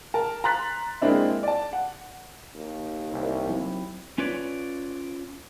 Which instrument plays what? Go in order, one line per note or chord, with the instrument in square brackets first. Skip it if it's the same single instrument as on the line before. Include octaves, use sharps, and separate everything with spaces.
[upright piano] A#4 A5
A#5 C6 F#6 A6 B6
G#3 A#3 C4 D4 E4
D5 A5
F#5
[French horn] D#2
[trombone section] C2
[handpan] F#3 C4 E4
[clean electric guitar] C#4 F4 B4 C#5 D5